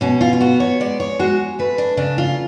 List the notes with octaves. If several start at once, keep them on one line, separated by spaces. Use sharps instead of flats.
B2 C#4
F4
F4
B3 F#4
C#5
G#3 D5
C#5
G#3 F#4
A3 B4
D4
C#3 D4
F4